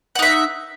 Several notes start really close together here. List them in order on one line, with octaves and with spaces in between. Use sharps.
F#5 D#4 E5